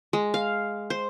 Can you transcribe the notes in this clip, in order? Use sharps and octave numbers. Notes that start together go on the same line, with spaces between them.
G#3
F5
C5